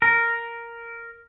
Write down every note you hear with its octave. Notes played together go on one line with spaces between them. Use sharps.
A#4